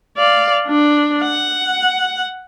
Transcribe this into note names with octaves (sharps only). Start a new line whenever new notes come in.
D5 F5
D4
F#5